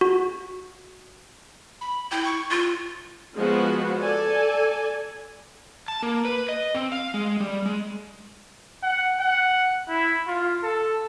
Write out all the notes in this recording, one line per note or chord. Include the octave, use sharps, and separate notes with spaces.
F#4
B5
E4 G5
C#6
F4
F3 G#3 B3 F#4
A4 D5 G#5
A5
A#3
B4
D#5
C4
F5
G#3
G3
G#3
F#5
F#5
E4
F4
A4